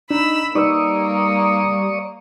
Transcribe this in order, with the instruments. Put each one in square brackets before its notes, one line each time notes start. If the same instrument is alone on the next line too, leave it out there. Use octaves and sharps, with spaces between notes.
[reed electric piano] D4 [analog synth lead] D#4 [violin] B5 E6
[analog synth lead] G3 [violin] A#3 [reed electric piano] D#4 B4 E6 [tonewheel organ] D5 C#6 D#6